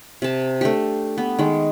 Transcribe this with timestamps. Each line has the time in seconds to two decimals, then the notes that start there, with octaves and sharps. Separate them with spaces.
0.22 C3 A5
0.61 A3 D4 G4
1.18 B3
1.39 D#3 G#3